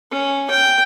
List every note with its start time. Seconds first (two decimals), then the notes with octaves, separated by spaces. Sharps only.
0.11 C#4
0.51 G5